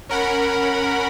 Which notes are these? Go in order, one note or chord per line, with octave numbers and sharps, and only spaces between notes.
C#4 A#4 F#5 B5